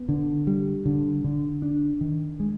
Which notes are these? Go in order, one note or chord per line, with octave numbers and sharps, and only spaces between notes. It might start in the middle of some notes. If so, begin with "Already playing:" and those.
Already playing: B3
D3
G3
D3
D3
D4
D#3
G#3